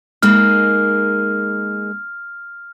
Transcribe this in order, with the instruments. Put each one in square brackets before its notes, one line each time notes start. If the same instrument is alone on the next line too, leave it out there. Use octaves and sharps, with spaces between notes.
[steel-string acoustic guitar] G#3 A#3 D#4 [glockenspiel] F6